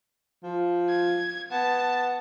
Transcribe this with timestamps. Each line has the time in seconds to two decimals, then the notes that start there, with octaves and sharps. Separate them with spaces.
0.43 F3
0.89 G#6
1.51 B3 A5